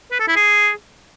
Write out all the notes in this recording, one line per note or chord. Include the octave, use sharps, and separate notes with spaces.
B4
A4
E4
G#4